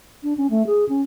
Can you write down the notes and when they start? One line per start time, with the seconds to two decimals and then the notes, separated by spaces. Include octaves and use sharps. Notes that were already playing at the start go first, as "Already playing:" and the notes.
0.23 D4
0.37 C#4
0.50 A3
0.67 G#4
0.89 C#4